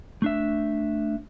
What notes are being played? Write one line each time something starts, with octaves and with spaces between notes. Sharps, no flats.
A3 D4 E5